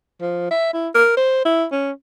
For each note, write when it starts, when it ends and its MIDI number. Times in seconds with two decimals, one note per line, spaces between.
0.21 0.50 53
0.51 0.72 76
0.73 0.89 64
0.95 1.13 70
1.17 1.41 72
1.45 1.66 64
1.72 1.91 61